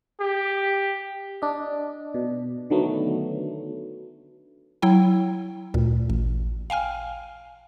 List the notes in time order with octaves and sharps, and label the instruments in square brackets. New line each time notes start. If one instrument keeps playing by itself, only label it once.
[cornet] G4
[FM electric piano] D4 D#5
B2
D3 D#3 F#3 A3 B3
[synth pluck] F#3 E4 G5
D2 A#2
A1
F5 G5 G#5 F6